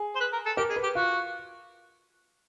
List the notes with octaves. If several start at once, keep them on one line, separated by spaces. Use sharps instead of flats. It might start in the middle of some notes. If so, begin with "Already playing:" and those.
Already playing: G#4
C5
B4
A#4
A4
G4 A#4
G#4
B4
G4
F4 F#4